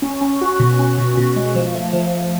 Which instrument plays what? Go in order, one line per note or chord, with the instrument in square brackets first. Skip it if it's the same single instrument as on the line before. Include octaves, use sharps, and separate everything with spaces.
[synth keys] C#4
C#4
F#4
B2
C#4
B2
B2
G#3
F3
A3
F3